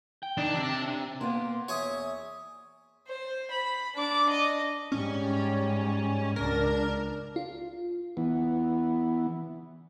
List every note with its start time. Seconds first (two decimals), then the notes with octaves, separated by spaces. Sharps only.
0.23 G5
0.37 D#3 D4
0.55 C3
1.21 A#3 B3 C6
1.68 E2 C#5 E5 G#5 D#6
3.07 C5
3.51 B5
3.95 D4 D6
4.30 D#5
4.92 G#2 G3 C#4
6.36 C#2 D4 A#4
7.36 F4
8.17 E3 B3